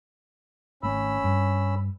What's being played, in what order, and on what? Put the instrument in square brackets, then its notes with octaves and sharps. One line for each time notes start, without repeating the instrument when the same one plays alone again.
[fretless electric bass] G#1 A3 [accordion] C#4 B5 E6
[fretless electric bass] G2